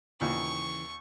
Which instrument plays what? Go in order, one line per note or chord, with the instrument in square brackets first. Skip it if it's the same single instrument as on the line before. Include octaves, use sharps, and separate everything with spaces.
[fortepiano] D#2 A#2 [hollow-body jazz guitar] C#3 E3 [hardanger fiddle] C#6